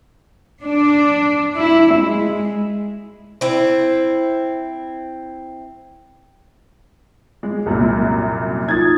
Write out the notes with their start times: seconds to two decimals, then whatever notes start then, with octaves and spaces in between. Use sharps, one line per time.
0.63 D4
1.55 E4
1.94 G#3
3.41 C4 E4
7.43 G#3
7.66 C2 F#2 A#2
8.68 D#4 F4 D#6 G#6 A6